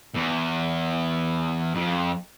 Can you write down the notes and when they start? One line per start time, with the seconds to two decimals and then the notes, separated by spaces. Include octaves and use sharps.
0.15 E2
1.75 F2